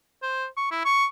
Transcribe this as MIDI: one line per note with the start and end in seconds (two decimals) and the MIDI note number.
0.22 0.47 72
0.57 0.68 85
0.71 0.84 64
0.85 1.05 85